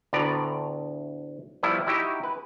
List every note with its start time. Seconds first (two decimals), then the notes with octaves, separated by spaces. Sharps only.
0.13 D2 A2 B3 D5 A#5
1.63 F3 G3 B3 E4
1.87 D#4 E4 F#4 G4
2.24 B4